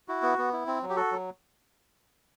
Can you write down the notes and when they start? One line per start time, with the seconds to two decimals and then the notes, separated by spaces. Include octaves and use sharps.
0.08 E4 F#4
0.23 B3
0.38 B3
0.53 E4
0.67 C4
0.82 F#3
0.89 G4
0.96 F#4 A4
1.12 F#3